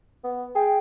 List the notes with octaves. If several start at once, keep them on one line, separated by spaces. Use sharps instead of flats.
B3
G#4 G5